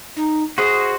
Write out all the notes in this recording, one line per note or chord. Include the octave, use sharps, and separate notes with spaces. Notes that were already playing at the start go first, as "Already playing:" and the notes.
D#4
F#4 G#4 C5 D#5